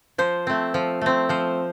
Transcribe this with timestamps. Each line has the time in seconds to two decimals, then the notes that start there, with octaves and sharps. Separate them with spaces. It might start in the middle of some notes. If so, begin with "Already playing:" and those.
0.18 F3 C5
0.47 A3 C4
0.74 F3
1.01 A3 C4
1.29 F3 C5